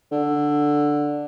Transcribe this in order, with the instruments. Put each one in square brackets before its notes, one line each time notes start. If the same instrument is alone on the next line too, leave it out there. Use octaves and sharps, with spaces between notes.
[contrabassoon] D3